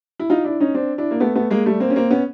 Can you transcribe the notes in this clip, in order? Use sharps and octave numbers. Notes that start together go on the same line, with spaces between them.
E4
D#4 F4
D4 E4
C#4 D#4
C4 D4
D4 E4
A#3
A3 B3
A3 B3
G#3 A#3
G3 A3
A#3 C4
C#4
A#3 C4
B3 C#4